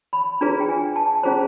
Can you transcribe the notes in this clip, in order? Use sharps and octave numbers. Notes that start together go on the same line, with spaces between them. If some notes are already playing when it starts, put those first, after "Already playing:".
B5
D4 F4 G#4 B4 A#5
G5
G#5
A5
C#4 F4 G#4 C5 A#5